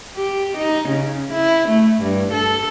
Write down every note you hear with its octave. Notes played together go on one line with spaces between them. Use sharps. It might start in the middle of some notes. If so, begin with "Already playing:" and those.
G4
D#4
C#3
E4
A3
G2
A4